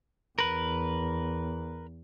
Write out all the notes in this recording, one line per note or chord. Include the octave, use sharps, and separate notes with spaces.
E2 A#4 B4